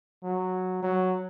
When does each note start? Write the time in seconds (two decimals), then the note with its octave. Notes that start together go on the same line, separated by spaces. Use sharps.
0.24 F#3
0.83 F#3